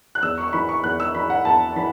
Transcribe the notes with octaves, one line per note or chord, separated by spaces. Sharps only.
F#6
E2 E6
C#6
C#6
E3 B5
C#6
E2 F#6
E6
E3 B5
F#5
E2 A5
E3 B5